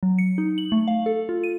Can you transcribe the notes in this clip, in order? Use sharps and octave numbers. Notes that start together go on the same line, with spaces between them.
F#3
C#7
D#4
F#7
A3
F5
A4
F4
D#7